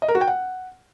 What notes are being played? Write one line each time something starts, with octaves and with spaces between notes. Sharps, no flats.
D#5
A#4
F#4
G5
F#5